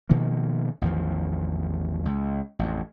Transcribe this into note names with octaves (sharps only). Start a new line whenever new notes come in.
B2 D#3 F3 A#3
A1 E2 D#3 F3
C#2
A1 F2